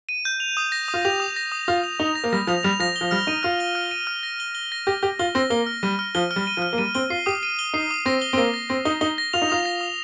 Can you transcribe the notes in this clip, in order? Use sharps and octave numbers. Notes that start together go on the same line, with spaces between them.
D#7
G6
F7
D#6
A#6
D#6
F4
G4 F7
D#6
A#6
D#6
F4 A#6
F7
D#4 F7
A#6
A#3
G3 A#6
F3 F7
G3 F7
F3 A#6
G7
F3
G3 F6
D#4 D#7
F4 F6
G7
F6
D#7
F6
A#6
G7
G7
A#6
G4 A#6
G4 G7
F4 G7
C4 A#6
A#3 G7
F6
G3 D#7
F6
F3 G7
F6
G3
D#7
F3
F6
A#3
G3 D#7
C4 G7
F4 C7
G4 D#6
D#7
G7
D#4 C7
D#6
C4 A#6
G7
C4
A#3 G7
A#6
C4 A#6
D#4 G7
D#4 G7
A#6
F4 F7
D#4
F4 D#6
A#6
D#6